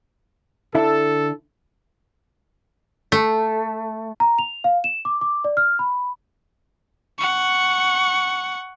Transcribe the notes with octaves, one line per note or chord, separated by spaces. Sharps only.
D3 E4 A4 E5
A3
A#5
F7
F5
E7
D6
D6
D5
F6
B5
F#5 C#6